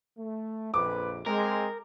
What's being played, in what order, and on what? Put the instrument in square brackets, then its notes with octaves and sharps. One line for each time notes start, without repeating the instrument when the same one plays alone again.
[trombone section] A3
[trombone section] A#1 F2 [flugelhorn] B4 [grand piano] D6
[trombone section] G#3 [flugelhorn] C4 [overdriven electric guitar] A#4